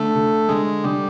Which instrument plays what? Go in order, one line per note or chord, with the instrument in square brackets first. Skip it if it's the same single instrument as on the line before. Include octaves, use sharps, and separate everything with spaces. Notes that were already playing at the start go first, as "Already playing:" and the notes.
Already playing: [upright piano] D3 [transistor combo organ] A3
[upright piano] D3
[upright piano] D3 [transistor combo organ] G#3
[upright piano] D3 [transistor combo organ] G3